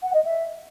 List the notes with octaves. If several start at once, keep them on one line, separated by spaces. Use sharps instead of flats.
F#5
D#5
E5